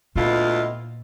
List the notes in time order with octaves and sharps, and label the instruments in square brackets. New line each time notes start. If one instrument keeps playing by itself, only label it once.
[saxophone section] D2 E4 F4 [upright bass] A#2 [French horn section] B3 D#5